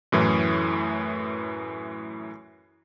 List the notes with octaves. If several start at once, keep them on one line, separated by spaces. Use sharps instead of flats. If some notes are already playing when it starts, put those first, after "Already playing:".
F#2 A2 E3